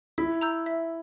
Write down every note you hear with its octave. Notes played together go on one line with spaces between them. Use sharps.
E4 E5
A#5 E6 G6
E5